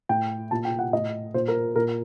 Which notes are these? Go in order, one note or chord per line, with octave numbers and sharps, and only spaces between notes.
A2 G5
A#2 A5
G5
F#5
A2 D#5
A#2 C5
A#4
A#2 A#4